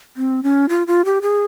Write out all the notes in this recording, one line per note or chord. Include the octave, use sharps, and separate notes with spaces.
C4
C#4
F4
F4
G4
G#4